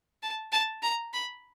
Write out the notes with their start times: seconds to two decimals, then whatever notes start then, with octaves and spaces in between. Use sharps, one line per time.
0.23 A5
0.52 A5
0.83 A#5
1.13 B5